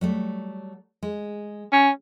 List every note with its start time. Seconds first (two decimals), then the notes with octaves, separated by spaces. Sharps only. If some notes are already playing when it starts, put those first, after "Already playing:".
0.01 F#3 G3 A3
1.03 G#3
1.72 C#4